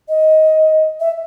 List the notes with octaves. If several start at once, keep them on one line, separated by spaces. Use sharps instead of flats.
D#5
E5